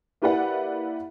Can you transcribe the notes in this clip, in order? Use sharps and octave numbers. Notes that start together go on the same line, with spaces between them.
A#3 E4 G4 B4 D5 F#5